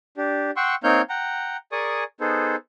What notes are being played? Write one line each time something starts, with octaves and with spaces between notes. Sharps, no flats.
D4 G4
F#5 G5 C6 C#6 E6
A#3 C4 D#4 C#5 F6 G6
F#5 G5 A#5
G#4 A#4 D5 G#5 C#6 D#6
B3 D#4 G#4 A4 C5